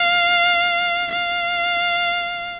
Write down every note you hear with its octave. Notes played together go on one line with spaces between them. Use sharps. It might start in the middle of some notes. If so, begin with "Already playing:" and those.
Already playing: F5
F5